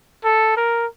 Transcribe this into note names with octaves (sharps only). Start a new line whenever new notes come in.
A4
A#4